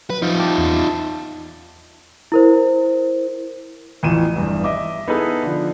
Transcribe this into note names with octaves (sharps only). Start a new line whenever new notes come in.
F#3 B4
F3 D#4 F4
G5 A5 D6
E2
A5
E4 A#4 C5
A1 E2 E3 F3 D#7 E7
F1 E2 G2
D#5 E5 D6
B3 D#4 E4 G#4 A4 B4
D3 F3